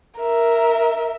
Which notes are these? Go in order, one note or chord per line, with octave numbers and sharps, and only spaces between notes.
A#4 E5